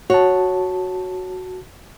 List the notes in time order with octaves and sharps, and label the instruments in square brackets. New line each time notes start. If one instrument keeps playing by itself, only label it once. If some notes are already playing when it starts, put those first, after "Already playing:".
[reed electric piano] F#4 A5 [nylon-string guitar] C#5 F#5